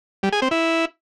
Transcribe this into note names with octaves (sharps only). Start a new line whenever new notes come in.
G3
G#4
C4
E4